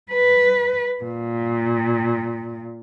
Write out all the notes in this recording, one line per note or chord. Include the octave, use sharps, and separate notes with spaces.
B4
A#2